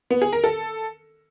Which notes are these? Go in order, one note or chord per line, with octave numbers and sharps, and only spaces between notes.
B3
G#4
A#4
A4